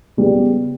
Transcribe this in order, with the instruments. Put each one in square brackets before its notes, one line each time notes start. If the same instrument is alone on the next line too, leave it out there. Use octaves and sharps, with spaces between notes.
[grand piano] C#3 G3 B3